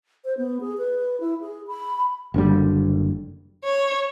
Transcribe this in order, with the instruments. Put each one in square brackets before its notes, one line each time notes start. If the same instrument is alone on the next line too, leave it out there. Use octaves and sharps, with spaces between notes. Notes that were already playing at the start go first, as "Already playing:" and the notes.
[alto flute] C5
B3
G#4
B4
E4
G#4
B5
[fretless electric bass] F#1 D3 G3
[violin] C#5